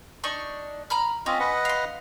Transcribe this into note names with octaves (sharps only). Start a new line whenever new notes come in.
D4 D#4 C#6
A#5 B5 F6
C4 C#4 F4 D#5
B4 D#5 F#5
F5 C6